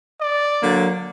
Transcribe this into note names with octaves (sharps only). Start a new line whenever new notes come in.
D5
D3 F#3 A#3